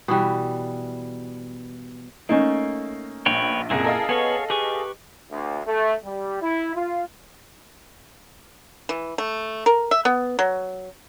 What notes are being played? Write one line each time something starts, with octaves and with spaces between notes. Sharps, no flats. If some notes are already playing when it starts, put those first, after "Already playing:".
B2 E3 G3
A3 A#3 C#4 D#4
A#1 B4 C#5 G5
F#1 C2 A#2 E4 G#4 A#4
A4 D#5 F5
B3 G#4 C#5 C#6
G4 G#4 B4 C#6
D2
A3
G3
E4
F4
E3
A3
A#4
E5
B3
F#3